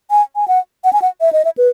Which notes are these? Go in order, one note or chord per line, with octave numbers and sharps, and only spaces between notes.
G#5
G#5
F#5
F#5
G#5
F#5
E5
D#5
E5
B4